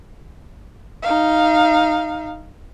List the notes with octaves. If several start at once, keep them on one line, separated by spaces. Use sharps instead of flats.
D#4 F5